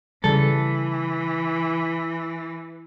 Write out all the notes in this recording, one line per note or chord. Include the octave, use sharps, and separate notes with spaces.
C#3 E3 G3 A4